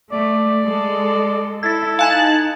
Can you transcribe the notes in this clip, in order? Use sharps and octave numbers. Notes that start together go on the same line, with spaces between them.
A3 D5
G#3 A4
E4 A4 G#6 A6
D#4 F5 G#5 A5 F#6 G#6